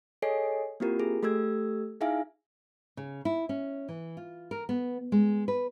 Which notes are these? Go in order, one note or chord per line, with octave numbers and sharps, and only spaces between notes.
G#4 A4 C#5 D#5 G#5 C7
A#3 C4 E4 F4 G4 A#4
G#4
A3 G4 A4 E6 G#6
D#4 E4 G#4 E5 F5 G#5
C#3
E4
C#4
E3
F4
A#4
B3
G#3
B4